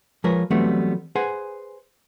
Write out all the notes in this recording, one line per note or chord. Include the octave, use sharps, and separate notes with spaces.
F3 G#3 A#4 B4 C#5
E3 F#3 G3 A3 B3 C4
G#4 B4 C5 F#5 G#5